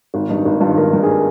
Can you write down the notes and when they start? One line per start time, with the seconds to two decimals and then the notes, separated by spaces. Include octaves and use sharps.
0.14 G#1
0.29 G2 D#3 D#4
0.45 G#1
0.61 G2 D#3 F4
0.77 G#1 A#4
0.93 G2 D#3
1.03 G#4
1.09 A#4